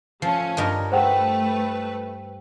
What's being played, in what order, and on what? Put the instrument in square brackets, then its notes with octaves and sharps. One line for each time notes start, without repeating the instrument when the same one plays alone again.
[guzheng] F3 [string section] A3 C#4
[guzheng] G2 D#4 A#4
[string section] A3 B4 [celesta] C5 F#5 G5